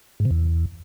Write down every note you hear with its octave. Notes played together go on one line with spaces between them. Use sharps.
G#2
C3
E2